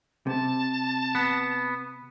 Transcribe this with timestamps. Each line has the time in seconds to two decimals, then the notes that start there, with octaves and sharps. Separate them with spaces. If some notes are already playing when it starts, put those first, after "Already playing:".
0.27 C3 A5
1.15 B3